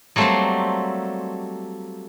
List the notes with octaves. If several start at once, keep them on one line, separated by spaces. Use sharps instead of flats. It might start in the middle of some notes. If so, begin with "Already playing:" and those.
F#3 G3 A3 A#3 C4 C5